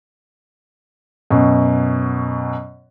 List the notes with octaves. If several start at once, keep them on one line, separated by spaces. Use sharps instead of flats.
F#2 B2